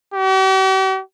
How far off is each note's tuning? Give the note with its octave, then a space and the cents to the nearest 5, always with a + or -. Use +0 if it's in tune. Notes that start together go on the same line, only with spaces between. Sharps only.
G4 -45